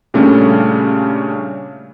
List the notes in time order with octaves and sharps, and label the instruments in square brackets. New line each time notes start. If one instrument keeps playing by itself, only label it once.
[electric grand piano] A#2 C#3 G3 A3 C#4 D4